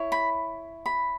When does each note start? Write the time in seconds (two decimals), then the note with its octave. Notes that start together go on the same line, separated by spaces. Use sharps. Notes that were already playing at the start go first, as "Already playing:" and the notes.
Already playing: E4 C#5
0.12 B5
0.86 B5